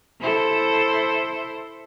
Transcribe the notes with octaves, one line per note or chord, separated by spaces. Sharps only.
E4 A4 C5